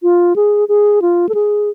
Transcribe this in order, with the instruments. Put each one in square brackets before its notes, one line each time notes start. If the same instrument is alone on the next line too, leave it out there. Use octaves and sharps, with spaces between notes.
[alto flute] F4
G#4
G#4
F4
A4
G#4